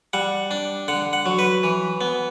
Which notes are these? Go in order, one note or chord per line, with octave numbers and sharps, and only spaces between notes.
G3 F#5
D4
D3 F#5
F#5
F#3
B4
E3
B3